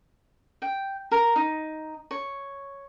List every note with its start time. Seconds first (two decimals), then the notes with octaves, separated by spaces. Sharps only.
0.62 G5
1.11 A#4
1.36 D#4
2.11 C#5